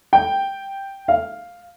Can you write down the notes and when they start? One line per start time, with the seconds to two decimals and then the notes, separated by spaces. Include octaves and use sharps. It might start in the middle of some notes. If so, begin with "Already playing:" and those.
0.13 G5
1.08 F5